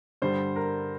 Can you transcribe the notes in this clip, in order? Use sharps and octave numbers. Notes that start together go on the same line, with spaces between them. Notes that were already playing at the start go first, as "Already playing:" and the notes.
G2 D3 G3 C5
A#4